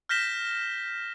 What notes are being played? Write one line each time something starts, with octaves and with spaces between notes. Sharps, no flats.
F6 G6 A#6 B6 E7 G7